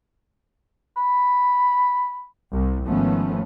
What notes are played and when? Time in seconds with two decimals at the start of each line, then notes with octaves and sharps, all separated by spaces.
0.97 B5
2.53 C2
2.86 G#1 D#3 F3 A3 B3 C#4